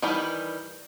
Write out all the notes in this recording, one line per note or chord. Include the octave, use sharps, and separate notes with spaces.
D#3 E3 G3